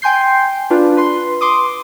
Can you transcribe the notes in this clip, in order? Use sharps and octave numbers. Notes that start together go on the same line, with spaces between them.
G5 G#5 C6 G6 C7
D4 F4 B4
B4 C6
C6 D6 D#6